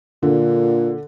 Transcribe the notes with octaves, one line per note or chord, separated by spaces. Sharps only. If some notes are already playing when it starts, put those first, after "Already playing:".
A#2 D3